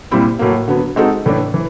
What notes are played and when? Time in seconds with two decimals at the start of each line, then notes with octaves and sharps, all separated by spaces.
0.11 A#2 G3 C4 E4
0.39 A2 F#3 A#3
0.68 D3 F#3 B3
0.96 G#3 C4 D#4 F#4 A4
1.26 A2 E3 A3 D4
1.54 E3